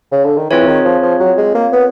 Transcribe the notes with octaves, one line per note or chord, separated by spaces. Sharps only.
C#3
D3
D#3
E3 C4 F4 G#4 C#5
D#3
F3
F3
F#3
G#3
A#3
B3